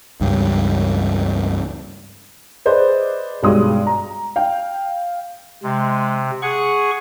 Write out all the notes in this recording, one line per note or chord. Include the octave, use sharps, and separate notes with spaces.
C#2 G2
G#4 B4 C5 D5 D#5
B1 G2 G#3 C6 D#6
A#5
F5 G5
C3 G#3
G#4 F#5 C#6